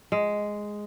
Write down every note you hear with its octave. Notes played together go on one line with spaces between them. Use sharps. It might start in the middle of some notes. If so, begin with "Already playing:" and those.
G#3